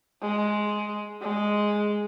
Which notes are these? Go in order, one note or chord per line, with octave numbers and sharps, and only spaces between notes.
G#3
G#3